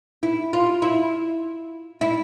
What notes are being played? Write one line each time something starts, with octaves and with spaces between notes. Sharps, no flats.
E4
F4
E4
E4